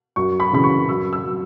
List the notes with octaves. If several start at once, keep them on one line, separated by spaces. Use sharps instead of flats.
F#2 C#6
B5
C#3 E3 B5
C#6
F#2 E6
E6
F#3